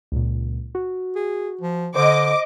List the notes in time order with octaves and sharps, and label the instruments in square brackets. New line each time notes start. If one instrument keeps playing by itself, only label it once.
[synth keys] C#2 A#2
F#4
[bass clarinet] G#4
F3
[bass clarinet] D3 [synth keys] C5 [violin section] D#5 D6